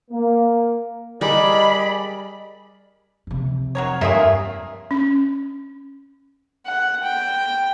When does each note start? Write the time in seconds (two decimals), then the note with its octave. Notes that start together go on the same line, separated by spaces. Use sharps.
0.11 A#3
1.21 G3 G#4 A#4 D5 D#5 B5
3.27 F2 C3
3.75 F#3 A#4 C#5
4.01 G2 A#3 F4 G#4 A#4 E5
4.91 C#4
6.66 F#5
7.03 G5